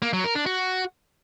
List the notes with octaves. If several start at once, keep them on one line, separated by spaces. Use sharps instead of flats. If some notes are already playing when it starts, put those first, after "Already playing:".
A#3
F#3
A#4
D4
F#4